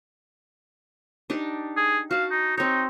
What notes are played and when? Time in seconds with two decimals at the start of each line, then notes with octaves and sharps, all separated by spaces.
1.30 D4 D#4 G4
1.77 G#4
2.11 F#4 F5 A5
2.31 D#4
2.58 C4 D#4 C#5